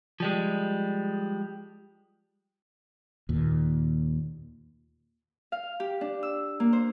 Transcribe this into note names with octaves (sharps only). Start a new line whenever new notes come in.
F3 G3 G#3
D#2 A#2
F5
G4
D4
E6
A#3
C5